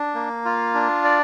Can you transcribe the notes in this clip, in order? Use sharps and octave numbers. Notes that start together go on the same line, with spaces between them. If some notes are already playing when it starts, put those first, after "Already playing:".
Already playing: D4
A#3
F4
D4
D5